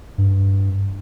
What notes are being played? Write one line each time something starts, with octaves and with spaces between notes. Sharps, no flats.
G2